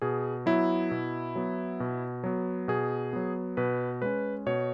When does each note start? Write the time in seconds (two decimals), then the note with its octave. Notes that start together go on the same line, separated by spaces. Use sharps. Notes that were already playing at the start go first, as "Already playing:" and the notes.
0.02 B2 G#4
0.46 F#3 B3 E4
0.91 B2
1.36 F#3 B3
1.80 B2
2.24 F#3 B3
2.68 B2 G#4
3.13 F#3 B3
3.57 B2 B4
4.02 G#3 C#4 B4
4.47 B2 C#5